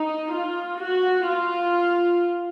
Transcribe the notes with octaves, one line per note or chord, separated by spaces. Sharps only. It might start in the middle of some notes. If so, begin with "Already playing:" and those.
Already playing: D#4
F4
F#4
F4